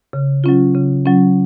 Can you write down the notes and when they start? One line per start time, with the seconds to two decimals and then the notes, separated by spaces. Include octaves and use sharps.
0.13 C#3
0.44 F#3 C#4 F4
0.75 C#3
1.06 F#3 C#4 F4